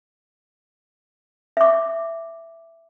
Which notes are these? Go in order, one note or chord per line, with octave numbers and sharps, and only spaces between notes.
E5 D6